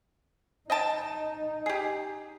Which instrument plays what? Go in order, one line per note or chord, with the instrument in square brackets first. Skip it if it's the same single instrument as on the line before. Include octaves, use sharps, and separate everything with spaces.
[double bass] D#4 [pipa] D#5 G5 A5
[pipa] G4 G#4